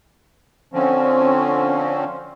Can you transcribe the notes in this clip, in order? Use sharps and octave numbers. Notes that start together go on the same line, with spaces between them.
D3 F3 C4 C#4